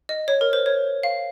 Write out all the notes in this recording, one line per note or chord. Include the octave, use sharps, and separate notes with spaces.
D#5
C#5
A#4
C5
C#5
F5